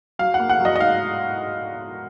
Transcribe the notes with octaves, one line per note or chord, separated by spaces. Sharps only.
F#3 F5
F#5
A#3
F#5
F#3
D#5
D#5
G#2 F5